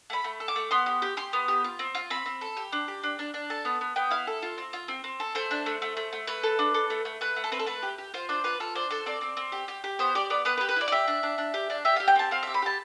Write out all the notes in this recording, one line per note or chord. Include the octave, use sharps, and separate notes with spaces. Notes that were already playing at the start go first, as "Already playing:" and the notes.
A3 B5
A3
A4
D6
A3
B3 C6
G4
G4
G4 C6
B3
G4
F4
C4
F4
C4 B5
C4
A4
G4
D4
G4
D4
D4
D4
A4 A5
B3
B3
B3 G5
E4 F5
A4
F4
C4
F4
C4
C4
A4
A3 C5
D4
A3
A3
A3
A3
A3 B4
A4
D4
A4
A3
A3
A3 B4
A3
A4
C4 B4
A4
A3 B4
G4
G4
F4 C5
D4 C5
F4 B4
F4 A4
D4 C5
A4 C5
C4 D5
C4
C4
G4
G4
G4
B3 C5
G4 D5
B3 D5
B3 B4
B4
G4
B4
E4 D5
D5
G4 E5
D4
D4
D4
G4
D4
G4 E5
G4 F5
G5
C4 A5
C4 F5
G4 E5
B5
G4 A5